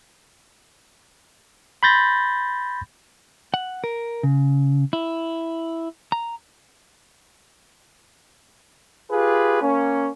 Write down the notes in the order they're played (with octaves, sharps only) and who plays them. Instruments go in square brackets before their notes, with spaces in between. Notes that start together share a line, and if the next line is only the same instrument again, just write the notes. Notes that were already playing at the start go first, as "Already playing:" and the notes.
[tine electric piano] B5 C6 G6 A6 A#6
[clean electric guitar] F#5
A#4
C#3
E4
A#5
[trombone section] F4 G4 G#4 B4
A#3 C#4